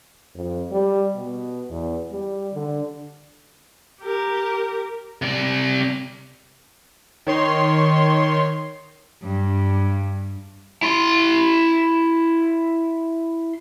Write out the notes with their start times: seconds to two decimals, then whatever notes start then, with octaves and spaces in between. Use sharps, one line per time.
0.35 F2
0.72 G3
1.15 B2
1.70 E2
2.11 G3
2.54 D3
4.02 G4 A#4
5.22 C3 D5
7.27 D#3 C#5 C6
9.23 G2
10.83 E4 C6